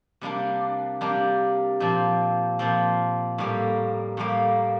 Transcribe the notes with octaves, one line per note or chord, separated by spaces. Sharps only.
C3 G3 A#3 D4
C3 G3 A#3 D4
A#2 F3 C4
A#2 F3 C4
A2 G3 A#3
A2 G3 A#3